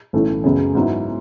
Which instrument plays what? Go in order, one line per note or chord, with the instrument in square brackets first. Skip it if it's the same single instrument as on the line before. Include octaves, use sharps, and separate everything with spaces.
[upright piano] B1 A2 E3 A3 C#4
F#2 C#3 G#3 B3
G#2 F#3 B3 E4